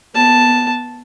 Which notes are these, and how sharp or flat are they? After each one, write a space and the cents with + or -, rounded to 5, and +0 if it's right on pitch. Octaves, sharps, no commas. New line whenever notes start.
B3 -10 A5 +0